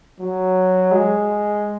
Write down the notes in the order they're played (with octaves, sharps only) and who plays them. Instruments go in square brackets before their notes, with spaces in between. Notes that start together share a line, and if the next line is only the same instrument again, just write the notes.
[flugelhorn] F#3
G#3